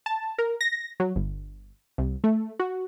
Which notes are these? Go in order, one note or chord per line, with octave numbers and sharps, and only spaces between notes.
A5
A#4
A#6
F#3
G1
C2
A3
F#4